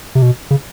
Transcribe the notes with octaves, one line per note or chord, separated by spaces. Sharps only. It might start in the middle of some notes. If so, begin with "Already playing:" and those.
C3
B2
C#3